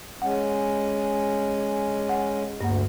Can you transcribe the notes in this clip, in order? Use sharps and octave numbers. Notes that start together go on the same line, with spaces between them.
G#3 C#4 F#5
F#5
D2 G2 A#3 F#5